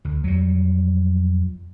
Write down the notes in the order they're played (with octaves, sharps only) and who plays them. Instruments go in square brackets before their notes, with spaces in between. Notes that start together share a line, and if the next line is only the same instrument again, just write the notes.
[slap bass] D2
[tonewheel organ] F2 [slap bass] F#3 G3